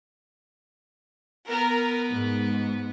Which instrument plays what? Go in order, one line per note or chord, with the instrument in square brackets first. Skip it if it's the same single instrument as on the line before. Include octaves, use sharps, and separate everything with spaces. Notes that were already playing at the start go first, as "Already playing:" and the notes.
[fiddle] B3 [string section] A#4
[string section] G#2